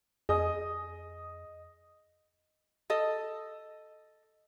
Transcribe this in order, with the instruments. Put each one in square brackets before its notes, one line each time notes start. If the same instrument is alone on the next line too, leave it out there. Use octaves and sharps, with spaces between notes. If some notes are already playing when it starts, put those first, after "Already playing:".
[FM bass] F2 [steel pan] G#4 [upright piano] D#5 D#6
[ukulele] A4 D#5